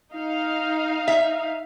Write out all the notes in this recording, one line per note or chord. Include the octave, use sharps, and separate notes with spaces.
D#4 F5
E5